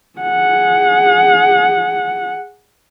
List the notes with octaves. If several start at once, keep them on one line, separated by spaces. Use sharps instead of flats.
G#4 F#5